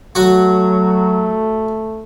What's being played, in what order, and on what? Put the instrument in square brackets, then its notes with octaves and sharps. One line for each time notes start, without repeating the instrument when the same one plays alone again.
[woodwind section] F#3 [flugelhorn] A3 [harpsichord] F#4